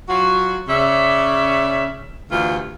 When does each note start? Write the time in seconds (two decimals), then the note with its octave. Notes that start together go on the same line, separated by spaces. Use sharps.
0.09 F#3 F4 F#4
0.68 C#3 C#4 D5 E5
2.30 D2 G2 D3 E3 F4